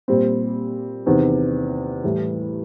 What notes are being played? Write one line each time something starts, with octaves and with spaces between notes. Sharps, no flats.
A#2 G3 C4
E2 C3 D#3
A2 E3 G3